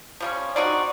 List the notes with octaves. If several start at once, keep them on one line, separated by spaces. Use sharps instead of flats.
F3 G3 C#4
C4 D#4 F#4 D5